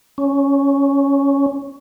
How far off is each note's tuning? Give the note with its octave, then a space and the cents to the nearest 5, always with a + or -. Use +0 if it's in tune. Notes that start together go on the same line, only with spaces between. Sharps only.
C#4 +0